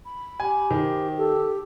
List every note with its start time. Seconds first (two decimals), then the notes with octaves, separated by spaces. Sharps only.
0.05 B5
0.40 G4 G#5
0.71 D#3 C5
1.17 G4 A4